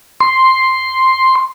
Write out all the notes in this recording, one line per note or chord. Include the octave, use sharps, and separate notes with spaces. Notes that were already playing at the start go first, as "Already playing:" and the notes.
C6